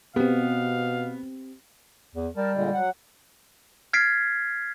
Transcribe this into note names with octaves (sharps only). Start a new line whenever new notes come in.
B2 B3 C4 G4 F5
E2
G3 A#4 A5
A#2 D3 G#3
F#3 F#5
F6 G#6 A6 B6 C7 D7